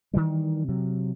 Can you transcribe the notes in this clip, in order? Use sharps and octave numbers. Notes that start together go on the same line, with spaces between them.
D#3 E3 G3
C3 F#3